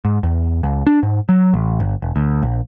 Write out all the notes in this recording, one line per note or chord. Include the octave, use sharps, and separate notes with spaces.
G#2
E2
C#2
D4
G#2
F#3
A1
G1
E1
D2
A#1